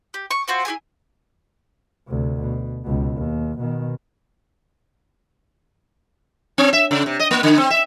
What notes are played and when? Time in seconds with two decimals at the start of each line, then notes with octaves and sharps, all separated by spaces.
0.14 G4
0.31 C#6
0.48 C4 F4 F#4 C5
0.65 E4 G4 G#4 G#5
2.07 D2 C3
2.41 B2
2.84 C#2 B2
3.16 D#2
3.59 B2 D#3
6.58 C4
6.73 E5
6.91 C#3
7.06 C3
7.20 D#5
7.31 A#3
7.43 D3
7.58 C4
7.70 E5